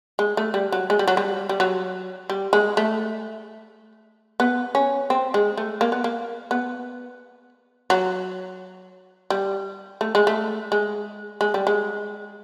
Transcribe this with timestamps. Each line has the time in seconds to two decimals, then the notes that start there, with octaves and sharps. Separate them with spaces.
0.19 G#3
0.37 A3
0.54 G3
0.72 F#3
0.90 G#3
0.99 G3
1.08 F#3
1.17 G3
1.49 G3
1.60 F#3
2.30 G3
2.53 G#3
2.77 A3
4.40 B3
4.75 C#4
5.10 C4
5.34 G#3
5.57 A3
5.81 A#3
5.92 B3
6.04 A#3
6.51 B3
7.90 F#3
9.30 G3
10.01 A3
10.15 G#3
10.27 A3
10.72 G#3
11.41 G#3
11.54 G3
11.67 G#3